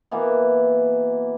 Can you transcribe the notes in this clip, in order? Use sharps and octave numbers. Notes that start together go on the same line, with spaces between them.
B2 E3 A#3